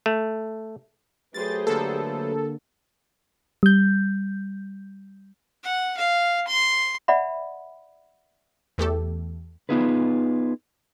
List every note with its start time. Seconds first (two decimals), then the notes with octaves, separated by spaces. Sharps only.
0.06 A3
1.34 F#3 A3 G4 G#4 B4 C5 A6
1.67 D3 A#3 A4
3.63 G3 G6
5.63 F#5
5.97 F5
6.47 C6
7.08 D5 E5 F#5 B5
8.78 E2 A3 G4 A4
9.69 B3 D#4 F4 G#4 B4